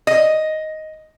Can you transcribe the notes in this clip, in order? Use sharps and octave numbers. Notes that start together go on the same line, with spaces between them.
D#5